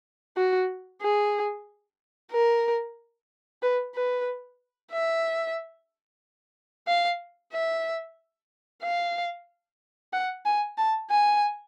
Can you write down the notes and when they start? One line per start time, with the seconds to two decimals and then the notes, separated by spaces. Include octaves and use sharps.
0.37 F#4
1.02 G#4
2.32 A#4
3.62 B4
3.95 B4
4.92 E5
6.87 F5
7.52 E5
8.82 F5
10.13 F#5
10.45 G#5
10.78 A5
11.10 G#5